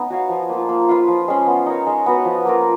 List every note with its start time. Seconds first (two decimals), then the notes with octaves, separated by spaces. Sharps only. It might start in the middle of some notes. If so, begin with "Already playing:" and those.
Already playing: B3 C#4 D#4
0.10 F#4 C#5 F5
0.29 F3
0.49 A#3 F4
0.69 A#3
0.89 F4 B4 F5
1.08 F3
1.28 G#3 C#4
1.47 B3
1.66 D#4 A#4 C#5
1.87 G#3
2.06 B3 F#4 B4
2.25 F3
2.45 A#3 F4 A#4